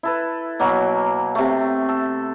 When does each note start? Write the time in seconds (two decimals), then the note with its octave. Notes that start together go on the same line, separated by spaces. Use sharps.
0.03 E4 A4 B4
0.60 B2 F#3 A#3
1.35 C3 A3
1.89 A4